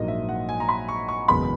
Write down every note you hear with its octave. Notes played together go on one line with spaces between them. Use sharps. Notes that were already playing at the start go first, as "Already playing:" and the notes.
Already playing: A#1 G#2 F#3 A#3 D#5
E5
F#5
G#5
A#5
B5
C#6
C#6
F#1 E2 B2 G#3 B3 B5